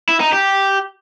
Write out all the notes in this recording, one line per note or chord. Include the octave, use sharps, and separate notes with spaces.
E4
D#4
G4